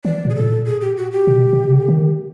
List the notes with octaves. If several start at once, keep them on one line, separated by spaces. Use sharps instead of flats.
E3 D5
A#2
G#4
A2 A4
A#2
G#4
G4
F#4
G4
B2
B2
C3
C#3
D3
D#3